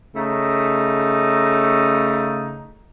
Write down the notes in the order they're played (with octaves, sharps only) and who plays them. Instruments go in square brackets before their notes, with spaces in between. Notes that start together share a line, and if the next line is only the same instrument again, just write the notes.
[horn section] C#3 A3 D#4